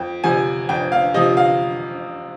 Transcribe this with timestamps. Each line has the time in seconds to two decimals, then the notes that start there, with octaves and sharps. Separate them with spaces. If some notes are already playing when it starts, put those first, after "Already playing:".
Already playing: F2 G5
0.24 C3 F3 G#5
0.69 F2 G5
0.92 F5
1.14 C3 F3 D#5
1.37 F5